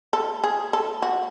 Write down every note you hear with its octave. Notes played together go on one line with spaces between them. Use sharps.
A4
G#4
A4
F#4